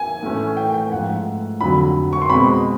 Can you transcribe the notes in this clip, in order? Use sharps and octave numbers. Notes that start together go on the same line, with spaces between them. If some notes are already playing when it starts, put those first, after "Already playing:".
Already playing: G#5
A2 E3 A3 C#4
G5
G5
G#2 F3 A3 F#5
F2 D3 F#3 B5
C#6
C6
B2 G#3 C4 B5